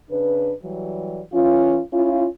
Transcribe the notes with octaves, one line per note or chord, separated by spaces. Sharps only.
C#3 D4 B4
E3 F#3 G3
E3 C#4 F4
C#4 E4 F4